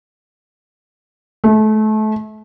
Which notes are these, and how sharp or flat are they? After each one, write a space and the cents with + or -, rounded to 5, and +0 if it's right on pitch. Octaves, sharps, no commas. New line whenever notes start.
A3 -30